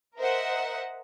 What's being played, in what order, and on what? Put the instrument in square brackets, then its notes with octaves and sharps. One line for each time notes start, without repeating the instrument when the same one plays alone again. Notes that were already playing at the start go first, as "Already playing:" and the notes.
[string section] A#4 C5 D#5 E5 F#5